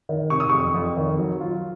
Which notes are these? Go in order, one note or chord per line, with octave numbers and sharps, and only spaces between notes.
D#3
C3 C#6
D#6
F2 C#6
F2
D#3
F#3
F4